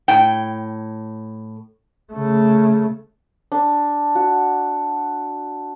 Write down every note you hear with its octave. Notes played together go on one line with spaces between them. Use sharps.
A2 G5
C#3 A3
D4
F#4